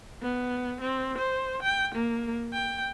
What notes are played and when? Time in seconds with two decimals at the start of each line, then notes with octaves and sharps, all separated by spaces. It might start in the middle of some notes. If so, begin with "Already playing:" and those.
0.22 B3
0.81 C4
1.18 C5
1.62 G5
1.95 A#3
2.53 G5